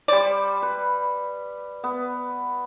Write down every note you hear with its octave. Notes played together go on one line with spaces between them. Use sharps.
G3 C5 D5
B4
B3